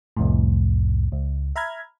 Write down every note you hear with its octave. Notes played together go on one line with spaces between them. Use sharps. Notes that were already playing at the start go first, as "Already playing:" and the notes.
C2 F2 A2
C#2
E5 A#5 B5 F6 G#6